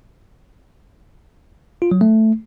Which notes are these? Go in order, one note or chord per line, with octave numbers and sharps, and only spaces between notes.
F4
F#3
A3